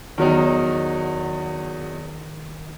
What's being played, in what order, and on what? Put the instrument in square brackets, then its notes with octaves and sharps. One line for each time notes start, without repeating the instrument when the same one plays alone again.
[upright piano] E2 F#3 D#4 [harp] D#3